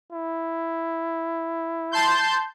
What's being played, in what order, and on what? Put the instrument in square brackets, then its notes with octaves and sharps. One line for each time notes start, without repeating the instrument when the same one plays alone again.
[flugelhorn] E4
[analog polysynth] A5 C6 G6